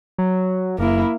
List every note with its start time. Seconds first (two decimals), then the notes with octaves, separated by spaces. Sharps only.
0.18 F#3
0.79 F#1 A#3 E4